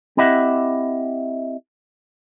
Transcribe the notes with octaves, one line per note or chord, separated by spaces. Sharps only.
C4 E4 G4 D#5 E5 F#5